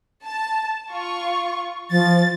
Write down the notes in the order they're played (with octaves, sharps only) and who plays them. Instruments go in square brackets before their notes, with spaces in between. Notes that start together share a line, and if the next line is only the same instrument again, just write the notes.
[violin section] A5
F4 C#6
[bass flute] F3 [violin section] A6